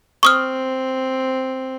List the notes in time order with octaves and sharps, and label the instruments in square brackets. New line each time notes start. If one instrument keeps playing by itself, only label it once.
[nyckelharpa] C4 [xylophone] C#6 D#6 F6